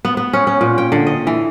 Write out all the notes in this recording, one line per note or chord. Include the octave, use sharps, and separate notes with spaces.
B3
B3
C#4
C#4
A#2
G5
D3
D#5
E3